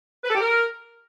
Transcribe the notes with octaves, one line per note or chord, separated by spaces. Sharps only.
B4
A4
G4
A#4